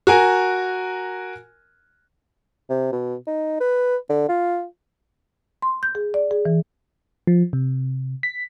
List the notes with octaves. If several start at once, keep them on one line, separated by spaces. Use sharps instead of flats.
F#4 A#4 G#5
C3
B2
D#4
B4
D3
F4
C6
G6
G#4
D5
G#4
E3
F3
C3
B6